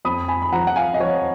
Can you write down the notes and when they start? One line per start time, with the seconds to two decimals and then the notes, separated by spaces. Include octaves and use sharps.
0.05 F2 B5 D#6
0.28 G#5 B5
0.42 B5
0.52 F3 F#5 A#5
0.67 F#5
0.76 F5 G#5
0.94 D#5
1.00 F3 C#5